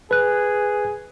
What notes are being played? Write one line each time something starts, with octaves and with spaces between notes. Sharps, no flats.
G#4 B4 F#6